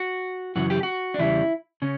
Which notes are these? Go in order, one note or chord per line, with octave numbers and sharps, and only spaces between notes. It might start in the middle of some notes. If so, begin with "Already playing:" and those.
Already playing: F#4
F#2 C#3 E3 F#4
G4
F#4
D4
E2 C#3 G3 E4
C#3 C#4